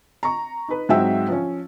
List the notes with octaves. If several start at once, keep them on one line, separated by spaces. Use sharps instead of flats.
A#5 C#6
D#4 B4
G#2 F#3 C4 E5 G5 E6
F3 C#4